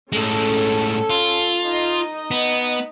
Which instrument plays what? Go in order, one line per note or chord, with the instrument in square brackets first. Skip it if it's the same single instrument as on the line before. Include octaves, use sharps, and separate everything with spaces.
[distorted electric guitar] A2 G#3 [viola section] C#4 A4
[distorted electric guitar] F4
[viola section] D#4 D#5
[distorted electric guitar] B3